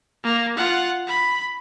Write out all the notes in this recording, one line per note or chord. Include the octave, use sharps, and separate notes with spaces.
A#3
F4 F#5
B5